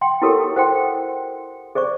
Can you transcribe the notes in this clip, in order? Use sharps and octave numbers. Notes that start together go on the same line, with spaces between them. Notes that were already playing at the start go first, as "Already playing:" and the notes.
F#5 G5 C6
E4 F#4 G4 A4 A#4 C#5
C5 F#5 G5 C6
G#4 C5 D5 C#6